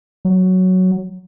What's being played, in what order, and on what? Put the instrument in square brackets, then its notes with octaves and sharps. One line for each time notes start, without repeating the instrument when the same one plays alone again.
[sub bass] F#3